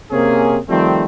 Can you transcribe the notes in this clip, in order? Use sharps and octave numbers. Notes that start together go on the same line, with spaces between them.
C3 A#3 C4 C#4 G#4
D#3 F3 G3 A3 C4